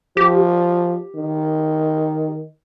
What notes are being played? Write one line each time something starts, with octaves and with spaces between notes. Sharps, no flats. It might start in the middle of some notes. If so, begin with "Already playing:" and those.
F3 G4
D#3